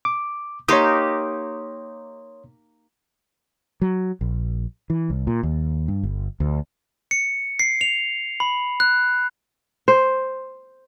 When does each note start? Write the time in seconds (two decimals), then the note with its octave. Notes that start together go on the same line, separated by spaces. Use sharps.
0.05 D6
0.68 A#3 D#4 G4 C#5 C6 D#6
3.81 F#3
4.21 A#1
4.90 E3
5.10 C2
5.27 A#2
5.43 D#2
5.88 G2
6.03 G1
6.40 D2
7.11 C#7
7.59 C7
7.81 F7
8.40 B5
8.80 F#6
9.88 C5